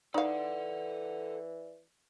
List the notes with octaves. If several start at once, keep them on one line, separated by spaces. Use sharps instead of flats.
E3 D#4 A4 D5 F5 F#5